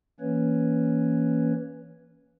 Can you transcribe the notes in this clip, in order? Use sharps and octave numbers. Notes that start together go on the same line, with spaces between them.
E3 A#3 C#4 B4 C#5